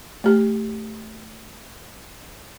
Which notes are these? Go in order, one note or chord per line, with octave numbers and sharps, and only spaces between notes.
A3 G4